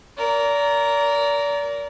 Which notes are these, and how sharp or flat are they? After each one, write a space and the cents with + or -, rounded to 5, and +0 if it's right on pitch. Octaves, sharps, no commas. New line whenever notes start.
A#4 +0 D5 -35